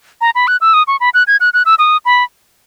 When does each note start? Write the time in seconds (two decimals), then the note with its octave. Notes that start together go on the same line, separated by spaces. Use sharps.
0.21 A#5
0.35 B5
0.48 F#6
0.61 E6
0.74 D#6
0.87 C#6
1.00 B5
1.14 F#6
1.27 G#6
1.41 F#6
1.54 F#6
1.66 E6
1.79 D#6
2.05 B5